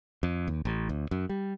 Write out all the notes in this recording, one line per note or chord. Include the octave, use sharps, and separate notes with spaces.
F2
D#2
A1
D2
F#2
G3